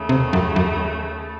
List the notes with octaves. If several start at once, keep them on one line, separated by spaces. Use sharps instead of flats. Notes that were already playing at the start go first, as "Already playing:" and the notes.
Already playing: D#2 C#3 A3
C3
F#2
F#2